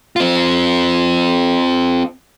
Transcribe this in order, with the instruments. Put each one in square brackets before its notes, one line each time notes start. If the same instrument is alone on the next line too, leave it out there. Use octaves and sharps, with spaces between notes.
[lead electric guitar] C4 F4